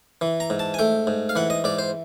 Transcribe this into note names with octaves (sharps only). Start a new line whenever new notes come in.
E3
A#5
G#2
A5
G#5
A3 G5
G#2
F5
E3 F#5
D#5
G#2 D5
C5